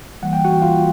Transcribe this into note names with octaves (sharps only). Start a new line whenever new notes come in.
E3 G3 A#3 F#5
G5
F#4 F#5
F4 F5